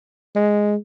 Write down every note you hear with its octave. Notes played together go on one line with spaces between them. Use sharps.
G#3